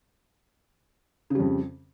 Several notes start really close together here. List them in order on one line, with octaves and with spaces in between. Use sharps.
C#3 G3 F2